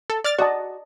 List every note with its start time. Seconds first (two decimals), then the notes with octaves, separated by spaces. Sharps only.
0.10 A4
0.24 D5 F6 A6
0.38 F#4 D5 D#5 A5